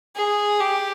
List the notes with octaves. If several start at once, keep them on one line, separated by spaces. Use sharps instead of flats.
G#4
G4